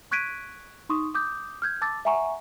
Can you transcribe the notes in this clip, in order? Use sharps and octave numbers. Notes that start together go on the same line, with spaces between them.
C#6 F#6 G#6 B6 D7 D#7
D#4 C6 C#6 D#6
D6 D#6 G6
F6 G6 G#6
A5 D6 E6 A6
E5 F#5 G#5 A#5 C#6